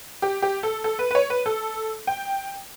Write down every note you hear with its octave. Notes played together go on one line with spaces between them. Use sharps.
G4
G4
A4
A4
B4
B4
C#5
B4
A4
G5